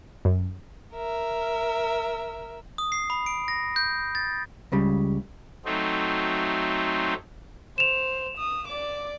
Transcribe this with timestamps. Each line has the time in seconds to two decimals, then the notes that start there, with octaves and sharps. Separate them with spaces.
0.25 F#2
0.93 A#4 E5
2.78 D#6
2.92 C7
3.10 B5
3.26 D7
3.48 A#6
3.76 G6
4.15 A6
4.72 C#2 C#3 G3
5.65 F#3 A3 C4 D#4
7.78 C5 E7 F7
8.37 D#6
8.68 D5 D6